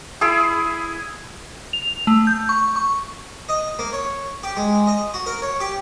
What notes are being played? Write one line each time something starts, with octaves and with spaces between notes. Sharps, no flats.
E4 G#4
F7
A3
G6
C#6
C#6
D#5
A#3
C#5
G4
G#3
D#5
F#4
A#4
C#5
G4